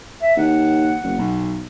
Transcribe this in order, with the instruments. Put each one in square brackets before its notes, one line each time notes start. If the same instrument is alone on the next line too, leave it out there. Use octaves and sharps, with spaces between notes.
[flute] E5
[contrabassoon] D#2 [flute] F#5
[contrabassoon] F#1
B1